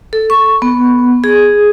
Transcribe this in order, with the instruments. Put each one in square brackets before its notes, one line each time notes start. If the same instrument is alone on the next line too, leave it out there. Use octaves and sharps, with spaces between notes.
[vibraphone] A4
C#6
B3
G#4